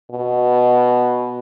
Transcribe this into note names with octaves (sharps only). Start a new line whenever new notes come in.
B2